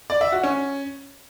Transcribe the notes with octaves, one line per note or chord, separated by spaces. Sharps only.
D5
E5
F#4
C#4